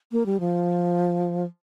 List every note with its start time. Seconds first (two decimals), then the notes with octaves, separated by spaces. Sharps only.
0.12 A#3
0.26 G3
0.40 F3